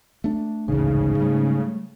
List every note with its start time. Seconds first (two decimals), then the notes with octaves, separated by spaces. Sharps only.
0.24 A3 D4
0.68 A1 D2 G#2 C#3
1.20 G3 A3